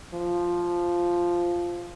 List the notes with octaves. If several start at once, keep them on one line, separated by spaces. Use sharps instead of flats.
F3